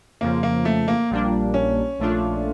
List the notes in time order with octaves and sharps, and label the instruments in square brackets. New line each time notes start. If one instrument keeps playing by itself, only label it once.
[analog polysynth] F2 C#3 F3 [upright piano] A#3
[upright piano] A#3
A3
A#3
[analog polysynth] A#1 A#2 G3 A#3 D4
[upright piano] C#4
[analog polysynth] A#1 A#2 A3 D4 F4